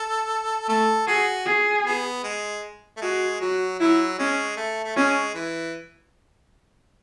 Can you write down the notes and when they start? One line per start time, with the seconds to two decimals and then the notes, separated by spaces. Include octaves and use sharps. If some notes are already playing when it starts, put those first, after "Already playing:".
Already playing: A4
0.68 A3 A4
1.07 F#4 G#4
1.46 G#4
1.85 B3
2.24 G#3
2.97 A3
3.01 G#3 F#4
3.41 F#3 F#4
3.79 F#3 E4
4.19 G#3 C#4
4.57 A3
4.84 A3
4.96 G#3 C#4
5.34 E3